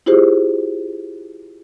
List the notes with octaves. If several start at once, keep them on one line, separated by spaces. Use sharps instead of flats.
E4 F4 G4 G#4 C5